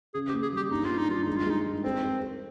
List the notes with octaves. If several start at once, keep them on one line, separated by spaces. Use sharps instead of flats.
C#3 G#4
G4
A#3
G#4
G3 G4
G2 D#4
F4
G2
D#4
G2 F4
G#3 D#4
F4
G#3 D#4
D#4
C4 C5
C5
C5